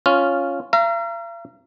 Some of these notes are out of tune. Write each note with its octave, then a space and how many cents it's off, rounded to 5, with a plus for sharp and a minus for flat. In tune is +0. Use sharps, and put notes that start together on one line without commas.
C#4 +0 F4 +0
F5 -45 A#5 +0